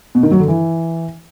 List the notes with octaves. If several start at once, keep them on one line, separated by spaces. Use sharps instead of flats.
B2
D#3
F#3
D3
E3